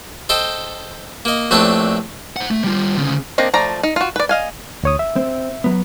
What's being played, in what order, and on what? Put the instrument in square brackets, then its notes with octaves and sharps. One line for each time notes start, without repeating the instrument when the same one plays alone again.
[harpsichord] A4 C5 D#5 G5
A#3 D#5
A#1 A2 C4 D4 B4
[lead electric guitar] C5 F#5
A3
G3 F4
D2 C#3
[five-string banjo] A#3 C4 D4 D#5
F3 A3 D5 A#5
D#4
F4 F#4
B4 D5
D#5 F5 G#5
[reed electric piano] D2 C#5 D#6
E5
[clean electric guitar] C4
F#3 B3